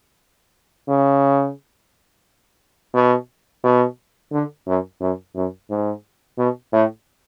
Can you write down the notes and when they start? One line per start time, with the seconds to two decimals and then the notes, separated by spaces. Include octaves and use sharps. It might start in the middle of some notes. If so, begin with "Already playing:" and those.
0.88 C#3
2.94 B2
3.64 B2
4.32 D3
4.67 F#2
5.01 F#2
5.36 F#2
5.70 G#2
6.38 B2
6.73 A2